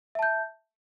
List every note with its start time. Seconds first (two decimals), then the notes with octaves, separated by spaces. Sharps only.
0.15 E5
0.19 A5
0.23 G6